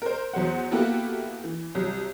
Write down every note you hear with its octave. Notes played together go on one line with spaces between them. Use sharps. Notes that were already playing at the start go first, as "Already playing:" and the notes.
A#4 C5
E2 F#3 C5 F#5
A#3 B3 E4 F#4 G4 A4
E3
C2 F#3